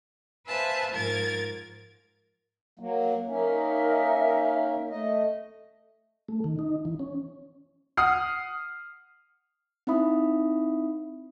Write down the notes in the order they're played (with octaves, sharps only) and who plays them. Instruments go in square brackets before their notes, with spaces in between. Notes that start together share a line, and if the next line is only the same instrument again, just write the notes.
[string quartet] B4 C5 E5 F5 G#5 A5
G#2 F3 A#4 G#6 A6
[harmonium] F#3 A#3
[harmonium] A#3 C#4 [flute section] D#4 A#4 E5
[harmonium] A3 D#5
[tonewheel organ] A3
D#3
D#4
E3
C#4
[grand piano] F#5 D#6 F6 C7
[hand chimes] C4 D#4 E4 E5 B5 D#6